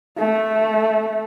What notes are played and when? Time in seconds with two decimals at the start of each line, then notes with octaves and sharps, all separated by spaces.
0.19 A3